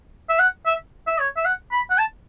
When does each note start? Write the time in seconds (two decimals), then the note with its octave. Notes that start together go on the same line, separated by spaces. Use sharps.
0.29 E5
0.39 F#5
0.66 E5
1.07 E5
1.20 C#5
1.37 E5
1.45 F#5
1.72 B5
1.90 F#5
1.98 A5